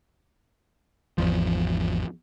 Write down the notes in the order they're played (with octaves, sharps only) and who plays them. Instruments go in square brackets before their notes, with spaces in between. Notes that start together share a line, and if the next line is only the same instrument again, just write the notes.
[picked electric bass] G#1 E2 F3